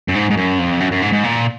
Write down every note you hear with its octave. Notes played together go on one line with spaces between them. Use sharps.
F#2
G#2
G#2
F#2
F2
F#2
F#2
G#2
G#2
A#2